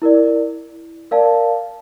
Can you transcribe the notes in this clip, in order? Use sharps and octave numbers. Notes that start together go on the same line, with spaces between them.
E4 A#4 D5
A#4 D5 F5 A5